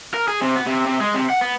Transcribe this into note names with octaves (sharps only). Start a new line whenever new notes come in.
A#4
G#4
C3
B3
C3
C3
G#3
C3
F#5
B3